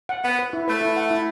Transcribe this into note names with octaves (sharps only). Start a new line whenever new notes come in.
F#5
B3 F#5
B4
E4
A3 B4
E4
F#5
E4